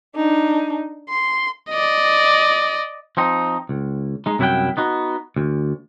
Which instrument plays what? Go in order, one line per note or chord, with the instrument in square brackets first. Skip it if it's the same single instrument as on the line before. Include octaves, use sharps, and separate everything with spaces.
[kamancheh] D4 D#4
C6
[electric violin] D5 D#5
[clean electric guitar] F3 C4 D#4
C#2
G#3 D#4
C2 F#2 E4 C5 F#5 G5
B3 D#4 F#4
D2